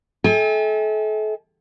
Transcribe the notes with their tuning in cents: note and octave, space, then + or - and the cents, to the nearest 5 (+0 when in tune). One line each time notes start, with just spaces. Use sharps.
A4 -35 E5 -40 G#5 -45